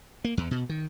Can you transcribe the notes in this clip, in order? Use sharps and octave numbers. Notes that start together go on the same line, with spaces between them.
A#3
E2
B2
D#3